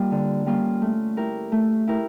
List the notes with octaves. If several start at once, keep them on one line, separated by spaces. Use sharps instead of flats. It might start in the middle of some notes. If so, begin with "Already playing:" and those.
Already playing: G3 A#3 F4
D3
G3 A#3 C#4 F4
A3
E4 G4 A#4
A3
E4 G4 A#4